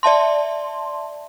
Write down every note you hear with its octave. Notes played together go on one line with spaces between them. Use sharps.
D5 E5 A5 C6